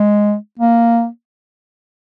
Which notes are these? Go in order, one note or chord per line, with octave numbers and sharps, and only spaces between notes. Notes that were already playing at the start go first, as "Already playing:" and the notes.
Already playing: G#3
A#3